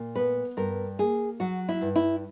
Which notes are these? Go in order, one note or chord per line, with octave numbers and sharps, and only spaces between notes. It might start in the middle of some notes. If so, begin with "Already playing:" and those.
Already playing: A#2
B3 B4
G2 A#4
A#3 G#4
F#3 F#4
E4
G2
E4